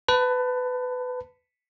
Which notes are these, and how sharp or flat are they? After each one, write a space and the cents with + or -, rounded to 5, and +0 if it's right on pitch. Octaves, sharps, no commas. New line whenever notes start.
B4 +20 A5 +20